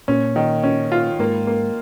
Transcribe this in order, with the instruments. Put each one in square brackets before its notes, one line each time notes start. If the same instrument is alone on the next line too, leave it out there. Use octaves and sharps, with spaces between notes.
[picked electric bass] A#2 [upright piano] C#4
[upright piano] D#3
C#4
F4
[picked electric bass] G#2 [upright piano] A#3
[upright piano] A#3